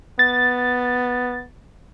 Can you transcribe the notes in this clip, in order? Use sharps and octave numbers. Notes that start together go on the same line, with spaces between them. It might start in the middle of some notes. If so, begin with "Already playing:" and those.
B3 A6